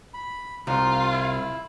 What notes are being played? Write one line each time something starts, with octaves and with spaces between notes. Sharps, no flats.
B5
C2 D#4 F4
E4